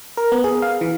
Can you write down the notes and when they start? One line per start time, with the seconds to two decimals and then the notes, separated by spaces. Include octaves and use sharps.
0.17 A#4
0.32 B3
0.44 G#4
0.62 F5
0.81 E3